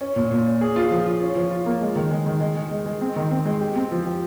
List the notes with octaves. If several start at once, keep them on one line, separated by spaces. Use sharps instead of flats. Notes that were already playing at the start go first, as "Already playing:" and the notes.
C#4
A#2
A#2
C#4
G#4
F4
F3
F4
C#4
F3
F4
A#3
G#3
D#3
G#3
D#3
G#3
G#3
G#3
G#3
C4
D#3
C4
G#3
G4
C4
F3
G4